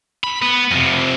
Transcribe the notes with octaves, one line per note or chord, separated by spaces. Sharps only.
B5
B3
F2 C3